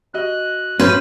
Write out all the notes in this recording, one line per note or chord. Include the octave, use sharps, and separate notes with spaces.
F#4 D#5 F#6
A#2 B3 C#4 F#4 B4 C5